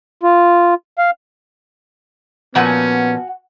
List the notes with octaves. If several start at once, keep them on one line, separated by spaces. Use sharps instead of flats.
F4
F5
A#2 F3 B3 C#4 F#4 F#5 G#5